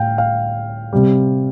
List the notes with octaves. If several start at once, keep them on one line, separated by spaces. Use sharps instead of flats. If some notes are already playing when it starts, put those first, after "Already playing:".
Already playing: A2 F5 G5
F5
C3 G3